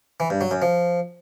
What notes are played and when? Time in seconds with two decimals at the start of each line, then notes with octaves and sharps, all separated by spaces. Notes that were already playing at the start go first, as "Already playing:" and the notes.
0.20 E3
0.30 G2
0.41 F#3
0.51 F#2
0.62 F3